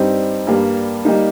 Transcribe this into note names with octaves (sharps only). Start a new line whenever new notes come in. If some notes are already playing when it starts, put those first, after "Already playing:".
Already playing: G2 G3 C4 D#4
G2 G3 A#3
G3 A#3 D#4